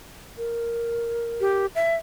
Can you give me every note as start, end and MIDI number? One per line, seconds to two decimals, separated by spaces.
0.38 1.65 70
1.41 1.66 67
1.75 1.94 76